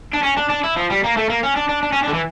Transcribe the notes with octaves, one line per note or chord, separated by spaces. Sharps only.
D4
C#4
D4
D4
E4
F3
G3
A#3
A3
A#3
C#4
D4
D4
D4
C#4
D4
D3
E3